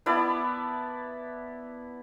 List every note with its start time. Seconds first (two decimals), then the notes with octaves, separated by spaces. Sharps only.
0.06 B3 E4 D5 A5